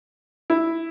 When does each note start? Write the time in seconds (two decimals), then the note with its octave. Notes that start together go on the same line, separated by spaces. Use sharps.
0.50 E4